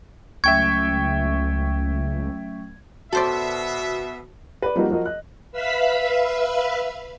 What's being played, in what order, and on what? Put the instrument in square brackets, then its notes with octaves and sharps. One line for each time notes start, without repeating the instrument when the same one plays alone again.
[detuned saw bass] C#2 [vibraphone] F#3 A3 C#4 [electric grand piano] E5 G5 C#6 [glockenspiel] G#6
[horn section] B2 E5 [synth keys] F#4 [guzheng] A4 C5 D5
[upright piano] B4 D5
F3 G3 A#3 D#4 F#4
F3 F#4 A#4 D#5
D#5 F#6
[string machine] B4 E5 F5 B5 E6 B6